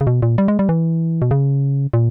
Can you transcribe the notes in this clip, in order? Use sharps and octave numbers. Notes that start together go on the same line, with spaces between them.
C#3
B2
A#2
G3
G#3
G3
E3
B2
C#3
A#2